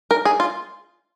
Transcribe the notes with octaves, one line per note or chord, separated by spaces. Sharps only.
A#4
G#4
F4